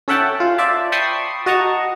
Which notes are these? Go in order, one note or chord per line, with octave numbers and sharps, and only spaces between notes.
C#4 A4 E5 F#5 G5 A5
F4
C5 D5 E5 A5
G5 A5 B5 C#6 D#6 C7
F#4 D#5 A5 A#5 C#6